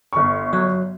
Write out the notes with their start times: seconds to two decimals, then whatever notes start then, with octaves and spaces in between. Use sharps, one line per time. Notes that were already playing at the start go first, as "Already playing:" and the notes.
0.13 G1 C#6
0.53 F#3